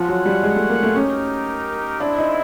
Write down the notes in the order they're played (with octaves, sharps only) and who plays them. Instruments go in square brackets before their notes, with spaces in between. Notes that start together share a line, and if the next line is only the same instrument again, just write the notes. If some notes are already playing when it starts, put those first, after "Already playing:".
Already playing: [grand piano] F3 [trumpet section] F4 G#4 C#5 F#5
[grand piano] F#3
G3
G#3
A3
A#3
A3
[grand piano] C#4 [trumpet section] D#4 G4 A#4
[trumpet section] G#3 C4 E4 [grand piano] D4
[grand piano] D#4